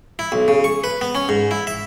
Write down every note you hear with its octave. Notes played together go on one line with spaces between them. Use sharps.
E4
B1
C#3
C#6
B4
B3
C#4
G#2
E4
E5